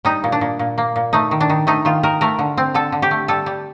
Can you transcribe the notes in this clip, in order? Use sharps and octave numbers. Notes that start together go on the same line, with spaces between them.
G3 D#4
A#2
D4
A#2
A#2
A#3
A#2
A3 D#4
D#3
D4
D#3
A3 D#4
D#3 F4
D#3 A#4
A3 A#4
D3
C4
D3 A4
D3
G4
A3
G3 A4
G3